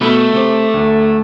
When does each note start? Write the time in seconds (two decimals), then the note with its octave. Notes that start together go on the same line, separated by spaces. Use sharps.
0.01 B2 A3 B5
0.33 C3 C5 D6
0.74 D2